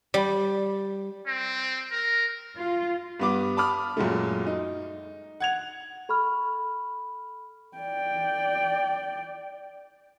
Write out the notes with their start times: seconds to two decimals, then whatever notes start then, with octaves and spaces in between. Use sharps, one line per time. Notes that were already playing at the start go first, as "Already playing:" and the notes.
0.14 G3
1.27 C4
1.92 A#4
2.56 F4
3.20 G2 B3 D6
3.57 A5 B5 D6 D#6 F6
3.97 F#2 A#2 G#3 A3
4.47 D#4
5.40 F#5 G#6 F7
6.09 A4 B5 C#6 F6
7.78 D5 G5